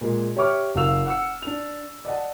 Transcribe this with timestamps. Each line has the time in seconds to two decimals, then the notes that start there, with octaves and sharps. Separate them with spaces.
0.01 A#2 G#3
0.36 G4 C#5 E5 C#6 D6 F6
0.75 F#1 F#4 F5 E6 F7
1.06 F#5 E6 C#7
1.42 D4 F7
2.05 D5 D#5 F#5 A5